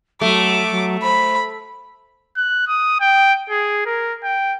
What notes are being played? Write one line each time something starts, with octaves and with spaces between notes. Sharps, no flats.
F#3 A3 D6
F#3
C5 B5
F#6
D#6
G5
G#4
A#4
G5